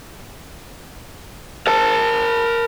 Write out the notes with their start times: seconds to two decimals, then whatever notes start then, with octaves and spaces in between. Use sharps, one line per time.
1.67 A#4 A5